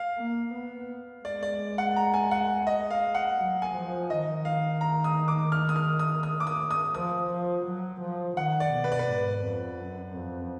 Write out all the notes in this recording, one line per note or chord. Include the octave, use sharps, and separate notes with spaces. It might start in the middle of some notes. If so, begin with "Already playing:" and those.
Already playing: F5
A#3
B3
G#3 D5
D5
F#5
A#5
G#5
F#5
D#5
F5
F#5
F#3
G#5
F3
D#3 D#5
F5
A#5
D#6
D6
F6
D#6
F6
D#6
D#6
D6
D#6
D#6
F3 D#6
F3
F#3
F3
D#3 F#5
D5
B2
B4
D5
B4
G#2
F2
F#2
F2